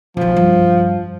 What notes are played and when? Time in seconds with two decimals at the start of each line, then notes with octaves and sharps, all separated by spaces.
0.17 B1 F3 F#3
0.37 G2